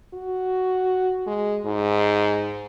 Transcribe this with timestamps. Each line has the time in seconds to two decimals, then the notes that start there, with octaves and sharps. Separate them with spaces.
0.14 F#4
1.27 G#3
1.65 G#2